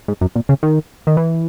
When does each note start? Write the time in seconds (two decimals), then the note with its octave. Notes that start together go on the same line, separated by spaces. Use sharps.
0.08 G#2
0.21 F#2
0.35 A#2
0.49 C#3
0.63 D#3
1.07 D#3
1.17 E3